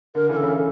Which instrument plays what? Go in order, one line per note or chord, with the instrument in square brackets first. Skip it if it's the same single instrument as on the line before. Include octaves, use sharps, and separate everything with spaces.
[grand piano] D3 [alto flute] A#4
[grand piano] C#3 E3 [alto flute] A#4
[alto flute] A4
[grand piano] C#3 E3